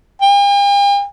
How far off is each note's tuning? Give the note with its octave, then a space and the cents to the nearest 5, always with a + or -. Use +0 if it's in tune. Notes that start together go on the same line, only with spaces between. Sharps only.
G5 +45